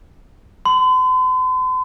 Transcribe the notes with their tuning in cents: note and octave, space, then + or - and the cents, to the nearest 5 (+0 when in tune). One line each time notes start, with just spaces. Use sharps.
C6 -45